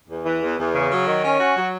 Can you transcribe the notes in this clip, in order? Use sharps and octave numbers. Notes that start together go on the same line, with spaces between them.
E2
E3
E2
E2
C#3
F#3
D#3
C#4
F#4
F#3